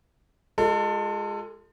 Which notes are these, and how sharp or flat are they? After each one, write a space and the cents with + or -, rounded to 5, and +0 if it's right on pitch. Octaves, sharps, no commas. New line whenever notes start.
G#3 -10 F4 +20 A4 +30